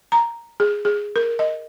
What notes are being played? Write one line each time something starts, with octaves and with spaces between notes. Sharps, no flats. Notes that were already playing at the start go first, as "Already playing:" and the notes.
A#5
G#4
G#4
A#4
D#5